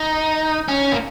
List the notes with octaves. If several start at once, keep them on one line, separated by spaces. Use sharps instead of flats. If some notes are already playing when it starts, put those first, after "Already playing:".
Already playing: D#4
C#4
A#3